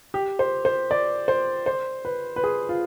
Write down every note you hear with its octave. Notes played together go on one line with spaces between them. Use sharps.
G4
C5
C5
D5
C5
C5
B4
B4
G#4
F4